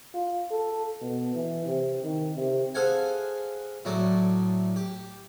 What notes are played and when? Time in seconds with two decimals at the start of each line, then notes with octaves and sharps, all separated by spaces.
0.14 F4
0.51 A4
1.01 B2
1.35 E3
1.66 C3
2.03 D#3
2.36 C3
2.75 G#4 A4 C5 F5 F#5 G#5
3.85 A2 F#3 A4 D5 D#6
4.76 G4